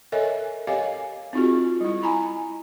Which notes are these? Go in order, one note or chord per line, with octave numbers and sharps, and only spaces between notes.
A4 A#4 C#5 D#5 E5 G#5
G4 C#5 D#5 F5 G#5
C4 D#4 F4 F#4 G#4
G3 E4
G#5 A#5 B5